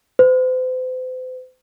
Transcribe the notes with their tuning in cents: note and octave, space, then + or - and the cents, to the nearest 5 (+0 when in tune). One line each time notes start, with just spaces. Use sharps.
C5 -40